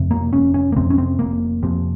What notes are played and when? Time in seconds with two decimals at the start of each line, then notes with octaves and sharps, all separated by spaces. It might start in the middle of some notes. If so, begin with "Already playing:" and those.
Already playing: F2 C3
0.11 A#3
0.33 F1 C#4
0.54 C#4
0.72 A#3
0.76 F2 C3 C4
0.90 C#4
0.98 C4
1.19 F1 A#3
1.63 F2 C3